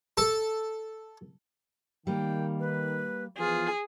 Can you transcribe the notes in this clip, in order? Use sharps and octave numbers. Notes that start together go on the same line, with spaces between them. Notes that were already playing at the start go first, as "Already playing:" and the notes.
A4
D#3 G3 A#3 G5
B4
E3 F3 B3 F4 G#4